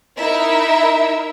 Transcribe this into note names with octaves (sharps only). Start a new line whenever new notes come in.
D#4 E4 A#4 E5